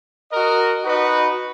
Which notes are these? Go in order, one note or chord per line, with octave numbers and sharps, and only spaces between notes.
F#4 A#4 D#5
D#4 F#4 B4 D#5